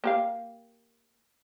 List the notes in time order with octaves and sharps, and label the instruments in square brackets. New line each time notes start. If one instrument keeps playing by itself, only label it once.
[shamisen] A#3 G4 F5